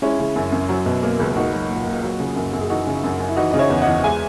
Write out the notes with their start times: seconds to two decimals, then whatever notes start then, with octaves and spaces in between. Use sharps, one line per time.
0.02 G#3 C#4 E4
0.19 C#3
0.36 F#2
0.52 F#2
0.69 F#3
0.86 B2
1.03 A#3
1.20 C#2
1.36 A#3 D#4 F#4
1.53 F#3
1.70 A#2
1.86 A#2
2.03 F#3
2.20 C#3
2.36 F#2
2.53 F#2
2.61 G#4
2.70 E3 D#4 F#4
2.87 C#3
3.04 F#2
3.20 F#2
3.29 E4
3.37 E3 D#4 F#4
3.51 C#3 D#5
3.59 C#5 E5
3.70 E2
3.82 D#5 F#5
3.87 E2
4.04 G#3 E5 G#5